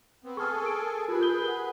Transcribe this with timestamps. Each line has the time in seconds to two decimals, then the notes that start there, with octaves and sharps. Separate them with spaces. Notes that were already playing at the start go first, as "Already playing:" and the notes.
0.24 B3 C4
0.37 G#4 A4 C#6 F6
0.62 A#4 D7
1.08 F4 G4 G#4 B4
1.20 A#4 G6 G7
1.48 F#5